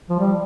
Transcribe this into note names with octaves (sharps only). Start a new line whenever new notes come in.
F3
G3